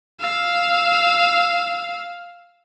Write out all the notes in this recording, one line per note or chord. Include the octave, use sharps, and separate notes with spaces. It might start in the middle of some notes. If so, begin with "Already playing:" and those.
F5 E6